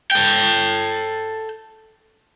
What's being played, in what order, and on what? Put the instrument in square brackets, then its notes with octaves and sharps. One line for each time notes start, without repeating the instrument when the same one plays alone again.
[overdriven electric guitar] A4 G5